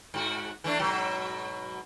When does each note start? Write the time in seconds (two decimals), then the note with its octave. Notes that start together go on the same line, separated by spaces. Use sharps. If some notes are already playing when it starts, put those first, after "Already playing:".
0.14 G#2 F#4
0.64 E3 A3 D4
0.79 G#2 B2 F#3